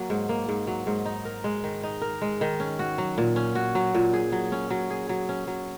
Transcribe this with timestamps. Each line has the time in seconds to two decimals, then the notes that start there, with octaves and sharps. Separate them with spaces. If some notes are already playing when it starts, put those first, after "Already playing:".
Already playing: F#3 A#3
0.10 G#2
0.29 A#3
0.49 G#2
0.67 F#3
0.87 G#2
1.06 D#4
1.25 A#4
1.44 G#3
1.64 D#3
1.83 D#4
2.02 A#4
2.22 G#3
2.41 D#3
2.60 C#4
2.79 F#4
2.98 F#3
3.18 A#2
3.36 C#4
3.55 F#4
3.75 F#3
3.95 A#2
4.13 G#4
4.32 F#3
4.52 C#4
4.70 F#3
4.90 G#4
5.09 F#3
5.29 C#4
5.47 F#3